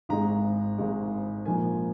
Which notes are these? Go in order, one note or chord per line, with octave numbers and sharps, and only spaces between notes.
G#1 G#2 G#3 A#5
G#1 G#2 G#3
A#1 G#2 F3 A#3 G#5